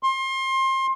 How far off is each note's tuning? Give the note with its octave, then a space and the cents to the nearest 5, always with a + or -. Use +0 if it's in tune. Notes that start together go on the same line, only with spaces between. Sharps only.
C6 +30